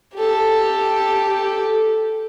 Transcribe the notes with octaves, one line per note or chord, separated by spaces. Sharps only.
G4 A4